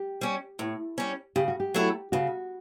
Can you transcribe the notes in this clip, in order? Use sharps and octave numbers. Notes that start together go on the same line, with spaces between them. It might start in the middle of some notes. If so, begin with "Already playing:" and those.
Already playing: G4
G3 C#4
A2
G3 C#4
C#3 G4
F#4
G4
F#3 A3 E4
C#3 F#4